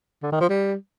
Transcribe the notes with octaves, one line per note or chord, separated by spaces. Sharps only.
D3
D#3
F3
G3